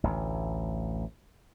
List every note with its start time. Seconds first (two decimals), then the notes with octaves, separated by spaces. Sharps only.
0.04 A1 D2